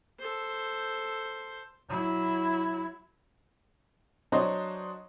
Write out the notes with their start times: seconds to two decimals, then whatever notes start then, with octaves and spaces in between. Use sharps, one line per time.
0.20 A4 C5
1.90 F#3 E4
4.32 F#3 D4 C5 C#5 D#5